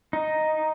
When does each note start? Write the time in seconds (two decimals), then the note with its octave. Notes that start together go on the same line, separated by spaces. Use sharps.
0.13 D#4